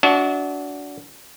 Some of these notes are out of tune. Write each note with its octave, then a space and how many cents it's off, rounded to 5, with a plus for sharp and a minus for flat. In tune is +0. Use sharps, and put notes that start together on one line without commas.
D4 -30 F#4 +0 E5 -35